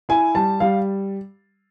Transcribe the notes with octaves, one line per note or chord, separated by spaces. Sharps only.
E4 G#5
G3 A5
G3 F5